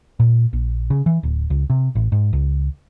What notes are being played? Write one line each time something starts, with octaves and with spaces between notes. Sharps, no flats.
A#2
A#1
C#3
E3
D1
C#2
C3
A1
G#2
C#2